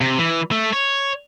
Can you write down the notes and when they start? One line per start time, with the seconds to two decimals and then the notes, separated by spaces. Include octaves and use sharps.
0.01 C3
0.18 E3
0.52 A3
0.73 C#5